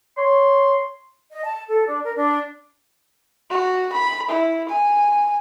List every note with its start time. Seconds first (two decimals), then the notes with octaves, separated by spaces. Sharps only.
0.18 C#5 C6
1.31 D#5
1.44 A5
1.68 A4
1.87 D4
2.03 A#4
2.16 D4
3.50 F#4
3.92 B5
4.29 E4
4.69 G#5